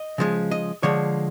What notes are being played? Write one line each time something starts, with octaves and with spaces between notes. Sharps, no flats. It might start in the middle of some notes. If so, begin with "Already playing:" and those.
Already playing: D#5
C#3 F3 G#3
D#5
D3 F3 G#3 C#5